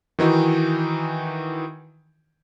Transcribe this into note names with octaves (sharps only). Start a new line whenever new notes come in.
D#3 E3 D#4 F#4